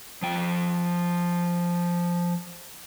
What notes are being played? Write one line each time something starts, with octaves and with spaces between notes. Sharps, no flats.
F3 G5